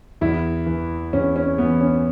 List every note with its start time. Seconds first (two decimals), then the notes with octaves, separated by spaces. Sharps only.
0.21 E2 E4
0.66 E3
1.13 E2 C#4
1.36 C#4
1.58 E3 B3
1.81 C#4